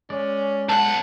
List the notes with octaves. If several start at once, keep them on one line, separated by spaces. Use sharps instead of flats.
G#3 C#4 D5
B1 F#5 A5